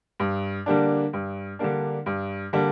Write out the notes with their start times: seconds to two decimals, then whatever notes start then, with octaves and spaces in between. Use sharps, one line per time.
0.20 G2
0.66 D3 G3 A#3 D4
1.13 G2
1.59 D3 G3 A#3 D4
2.06 G2
2.53 D3 G3 A#3 D4